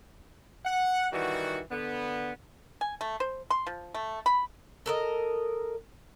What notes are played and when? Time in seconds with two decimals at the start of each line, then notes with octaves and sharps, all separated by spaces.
0.65 F#5
1.13 D#3 E3 G3 F#4
1.71 D3 B3
2.81 G#5
3.01 A3
3.20 C5
3.50 C6
3.67 F3
3.94 A3
4.26 B5
4.86 A4 A#4 D#5